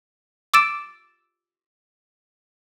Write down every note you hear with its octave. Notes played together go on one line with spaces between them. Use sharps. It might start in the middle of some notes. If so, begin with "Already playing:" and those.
D6 E6 A6 D7 E7